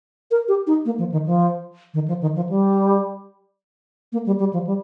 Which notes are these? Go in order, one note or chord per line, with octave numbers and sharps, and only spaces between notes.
A#4
G4
D#4
A#3
F3
D#3
F3
D#3
F3
D#3
F3
G3
A#3
G3
G3
F3
G3